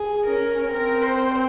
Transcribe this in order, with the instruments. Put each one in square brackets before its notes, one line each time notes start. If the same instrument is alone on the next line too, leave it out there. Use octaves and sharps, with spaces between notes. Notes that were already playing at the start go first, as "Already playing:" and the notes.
Already playing: [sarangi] G#4
[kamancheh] C#4 [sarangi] A#4
[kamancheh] C4 [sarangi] A#4
[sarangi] C5